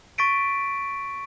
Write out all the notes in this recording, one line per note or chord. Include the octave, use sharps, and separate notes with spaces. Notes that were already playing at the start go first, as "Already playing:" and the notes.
C#6 A6 B6 D7 D#7